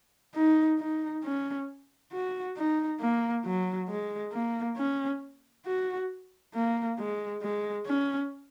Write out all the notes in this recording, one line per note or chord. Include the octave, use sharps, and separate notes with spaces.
D#4
D#4
C#4
F#4
D#4
A#3
F#3
G#3
A#3
C#4
F#4
A#3
G#3
G#3
C#4